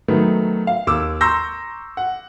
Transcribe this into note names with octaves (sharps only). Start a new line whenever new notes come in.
D#3 F#3 A3 B3
F5
D#2 D6 E6
A#5 C6 C#6 E6 G6 A#6
F#5